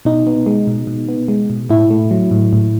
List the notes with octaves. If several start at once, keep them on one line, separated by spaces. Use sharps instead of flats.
B2 D#4
B3
G#3
B2
B2
B3
G#3
B2
A2 E4
A3
F#3
A2
A2